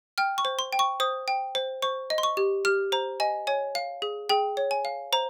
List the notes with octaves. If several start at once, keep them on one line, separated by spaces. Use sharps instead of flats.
G5 F6
C#6
C5
C6
G5
C#6
C5 D#6
G5
C5
C5 C#6
D#5
C6
C#6
G4
G4 F6
C5 A#5
D#5 G#5
C#5 G#5
F5
G#4
G#4 G5
C#5
G#5
F5
C5 A#5